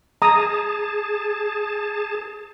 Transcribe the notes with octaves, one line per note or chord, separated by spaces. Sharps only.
G#4 A5 A#5 D#6